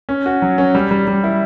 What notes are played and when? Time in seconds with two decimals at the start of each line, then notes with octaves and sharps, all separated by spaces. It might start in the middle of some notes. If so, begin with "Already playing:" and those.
0.09 C#4
0.26 F#4
0.42 F#3
0.58 C#4
0.75 G3
0.91 G3
1.07 G3
1.24 E4